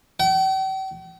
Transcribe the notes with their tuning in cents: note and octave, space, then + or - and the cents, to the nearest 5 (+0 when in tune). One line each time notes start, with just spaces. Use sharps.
G5 -40